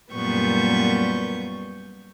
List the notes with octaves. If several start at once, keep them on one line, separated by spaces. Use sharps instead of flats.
F#2 A#2 G3 B3 C#6 G6